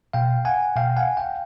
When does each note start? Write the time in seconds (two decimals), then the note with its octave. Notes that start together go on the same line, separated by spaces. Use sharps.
0.13 B2 F5 G5
0.45 F#5 G#5
0.76 B2 F5 G5
0.97 F#5 G#5
1.17 F5 G5